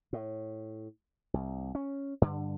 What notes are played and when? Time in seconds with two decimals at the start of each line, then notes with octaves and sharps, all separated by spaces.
0.13 A2
1.34 C2
1.75 C#4
2.22 G2 D3